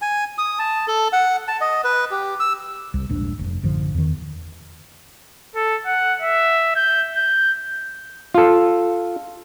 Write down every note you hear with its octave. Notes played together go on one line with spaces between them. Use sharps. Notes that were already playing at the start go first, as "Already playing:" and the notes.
G#5
D#6
A5
A4
F#5
A5
D#5
B4
G4
E6
C2
D#1 A#1 G#2 D4
F1
A1 F#2 D3 F3
E2 D#3
A4
F#5
E5
G6
G6
F4 A4